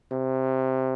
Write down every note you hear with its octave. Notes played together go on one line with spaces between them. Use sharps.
C3